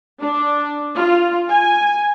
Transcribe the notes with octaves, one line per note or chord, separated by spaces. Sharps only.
D4
F4
G#5